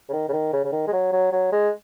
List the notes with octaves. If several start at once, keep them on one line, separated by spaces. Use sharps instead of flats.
C#3
D#3
C#3
D#3
C#3
C#3
D#3
G#3
F#3
F#3
F#3
G#3